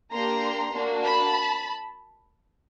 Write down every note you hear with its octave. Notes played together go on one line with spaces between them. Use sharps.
A#3 D4 G4 A#5 C6
A#3 D4 F#4
A5 B5